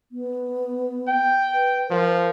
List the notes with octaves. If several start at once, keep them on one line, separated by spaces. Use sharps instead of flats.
B3
G5
B4
F3 A#4